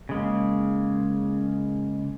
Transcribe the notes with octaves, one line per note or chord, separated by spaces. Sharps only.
C#3 G#3 A#3